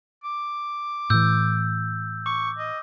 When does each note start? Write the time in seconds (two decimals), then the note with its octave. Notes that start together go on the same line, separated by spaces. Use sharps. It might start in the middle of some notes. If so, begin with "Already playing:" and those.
0.24 D6
1.10 A2 E3 E6 G6
2.26 C#6 D6
2.58 D#5